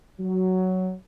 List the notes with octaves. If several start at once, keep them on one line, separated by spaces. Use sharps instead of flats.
F#3